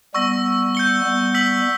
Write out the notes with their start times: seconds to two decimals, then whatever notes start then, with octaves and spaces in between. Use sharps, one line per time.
0.14 G3 B3 C#6 E6 A#6
0.75 G6 C#7 G7
1.04 G3 B3
1.35 E6 B6 F#7